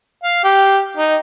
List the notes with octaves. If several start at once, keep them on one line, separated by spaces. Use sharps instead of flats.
F5
G4
D#4